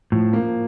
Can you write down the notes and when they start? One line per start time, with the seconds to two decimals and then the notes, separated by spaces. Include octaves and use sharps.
0.12 A2 F3
0.33 A#3